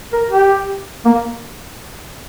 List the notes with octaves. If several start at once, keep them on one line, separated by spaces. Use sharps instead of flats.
A#4
G4
A#3